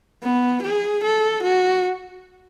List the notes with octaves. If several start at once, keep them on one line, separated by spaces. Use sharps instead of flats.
B3
G#4
A4
F#4